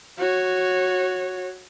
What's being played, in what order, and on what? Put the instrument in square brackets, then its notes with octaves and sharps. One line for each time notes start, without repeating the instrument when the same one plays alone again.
[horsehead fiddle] F#4 C#5